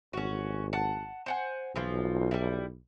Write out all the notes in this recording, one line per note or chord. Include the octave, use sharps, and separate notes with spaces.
G#1 C#4 F#4
F#5 A5
C5 F#5 G#5
B1 E3 F3 F4
G3 E4